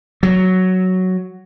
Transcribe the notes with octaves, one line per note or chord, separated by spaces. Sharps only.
F#3